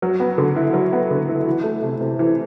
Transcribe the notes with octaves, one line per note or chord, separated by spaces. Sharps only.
F#3
B3
D3
E4
F#3
B3
D3
E4
E3
A3
C3
C3
E3